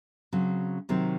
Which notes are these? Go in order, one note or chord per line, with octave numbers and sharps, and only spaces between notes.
C#3 F#3 C4
C3 D#3 F#3 C4